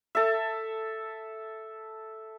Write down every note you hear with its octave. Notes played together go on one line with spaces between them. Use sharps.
A4 E5